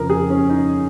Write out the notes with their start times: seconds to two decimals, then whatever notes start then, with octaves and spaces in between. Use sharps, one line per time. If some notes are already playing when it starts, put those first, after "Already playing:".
Already playing: F2 C#3 F3 A#4
0.10 G#4
0.30 C#4
0.49 D#4